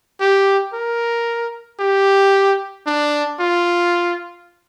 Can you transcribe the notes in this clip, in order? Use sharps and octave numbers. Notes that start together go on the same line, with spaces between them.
G4
A#4
G4
D4
F4